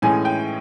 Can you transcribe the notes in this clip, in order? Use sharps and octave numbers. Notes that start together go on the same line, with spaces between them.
A2 E3 G#3 C#4 G#5
G5